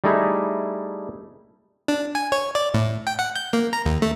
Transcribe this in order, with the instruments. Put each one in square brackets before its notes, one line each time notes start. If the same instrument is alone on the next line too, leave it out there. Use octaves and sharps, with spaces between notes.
[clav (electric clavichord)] G3 A3 D#4 E4 G#4
[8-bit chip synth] D4
G#5
C#5
D5
A2
G5
F#5
G6
A#3
A#5
D#2
A3